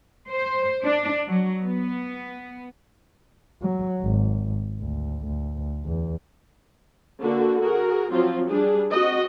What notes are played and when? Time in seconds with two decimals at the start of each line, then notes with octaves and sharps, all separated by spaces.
0.29 C5
0.84 D4
1.27 F#3
1.61 B3
3.62 F#3
4.02 G#1
4.80 D2
5.26 D2
5.85 E2
7.22 D3 A#3 D4 F#4
7.61 F#4 G#4 A#4
8.11 F3 F#3 C4 F4
8.49 G3 D4 G#4
8.92 C4 F#4 D#5